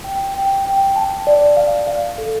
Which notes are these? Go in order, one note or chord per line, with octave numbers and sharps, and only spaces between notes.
G5
G5
G5
A5
D5
F5
F5
A4